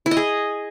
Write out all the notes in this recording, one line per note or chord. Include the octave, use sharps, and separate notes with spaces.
E4
D#5
G#4